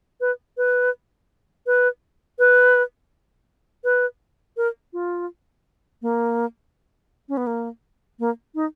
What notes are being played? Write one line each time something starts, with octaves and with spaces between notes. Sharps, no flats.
B4
B4
B4
B4
B4
A#4
F4
A#3
C#4
B3
A#3
A#3
D#4